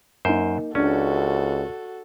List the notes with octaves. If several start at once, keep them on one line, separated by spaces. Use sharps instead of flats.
F#2 A#3 D#4 C5
C#2 C#4 D4 F#4 A4